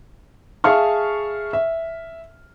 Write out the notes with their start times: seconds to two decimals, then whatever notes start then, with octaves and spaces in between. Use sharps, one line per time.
0.64 G#4 E5 F5 A5 C#6 F6
1.53 E5